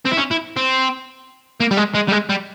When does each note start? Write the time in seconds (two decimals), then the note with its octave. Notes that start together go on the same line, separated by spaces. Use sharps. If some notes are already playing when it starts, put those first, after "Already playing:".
0.05 C4
0.12 E4
0.17 C#4
0.31 E4
0.57 C4
1.60 A#3
1.71 G3
1.77 G#3
1.95 G#3
2.08 G3
2.12 G#3
2.29 G3